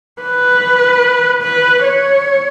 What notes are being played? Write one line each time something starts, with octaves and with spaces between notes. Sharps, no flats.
B4
B4
C#5